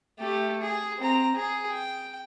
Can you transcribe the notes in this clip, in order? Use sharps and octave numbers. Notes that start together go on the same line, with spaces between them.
A3 G4
G#4
C4 A#5
G#4
G5